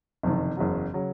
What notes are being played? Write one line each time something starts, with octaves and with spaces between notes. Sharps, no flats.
F#1 F2 C3 D#3
F#1 E2 C#3 F#3
C#3 F#3